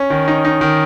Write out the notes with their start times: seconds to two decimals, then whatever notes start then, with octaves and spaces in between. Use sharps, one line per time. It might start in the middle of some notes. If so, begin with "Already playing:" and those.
Already playing: C#4
0.10 D#3
0.28 D#4
0.45 D#4
0.61 D#3